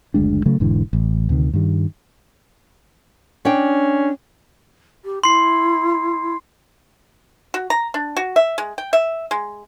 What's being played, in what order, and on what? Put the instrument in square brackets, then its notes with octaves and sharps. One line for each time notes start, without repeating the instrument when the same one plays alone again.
[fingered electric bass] F#1 D2 G#3 D4
C#3 F#3 A3
E1 G#2 D3 E3
A1
D2 C3 D#3
G2 D#3 G3
[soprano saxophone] C#4 [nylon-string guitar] D4 G5
[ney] G4
[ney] E4 [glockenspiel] C6 C7
[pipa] F#4
A#5
D4
F#4
E5
G#3
G5
E5
G#3